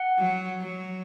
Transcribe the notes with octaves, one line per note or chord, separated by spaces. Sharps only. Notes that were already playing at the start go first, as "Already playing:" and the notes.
Already playing: F#5
F#3
F#3